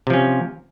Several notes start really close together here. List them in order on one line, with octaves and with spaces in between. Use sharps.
C3 F3 C#4